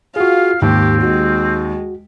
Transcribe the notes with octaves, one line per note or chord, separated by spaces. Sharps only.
F4 F#4 G#4 F5
D#2 G#2 C4 G4
G#3 F#4